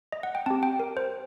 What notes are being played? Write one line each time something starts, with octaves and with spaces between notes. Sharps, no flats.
D#5
F#5
G5
C4 G4 A5
G5
A#4
C5